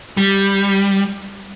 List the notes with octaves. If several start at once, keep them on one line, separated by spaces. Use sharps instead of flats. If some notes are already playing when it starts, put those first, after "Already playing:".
G3